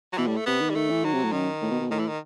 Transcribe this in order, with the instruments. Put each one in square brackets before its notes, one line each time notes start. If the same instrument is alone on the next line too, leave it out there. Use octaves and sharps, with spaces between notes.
[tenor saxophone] F#3
[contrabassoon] B2 [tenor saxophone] E3
[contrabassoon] A2 [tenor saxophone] G3
[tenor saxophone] A3
[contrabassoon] C3 [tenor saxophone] B3
[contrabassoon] D#3
[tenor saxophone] G3
[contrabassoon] D#3 [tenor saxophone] A3
[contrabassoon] E3
[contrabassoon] D#3 [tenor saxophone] F#3
[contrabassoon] C3
A2
[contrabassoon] F#2 [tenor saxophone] D#3
[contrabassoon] A2
B2
B2
[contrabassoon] A2 [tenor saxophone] D#3
[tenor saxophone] E3
D#3